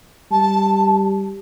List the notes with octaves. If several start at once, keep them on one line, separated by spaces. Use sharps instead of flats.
G3 A5